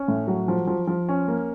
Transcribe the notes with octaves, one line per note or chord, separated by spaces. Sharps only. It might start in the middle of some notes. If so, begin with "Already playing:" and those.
Already playing: C#4
A2
F#3
F3
F3
F3
C#4
A#3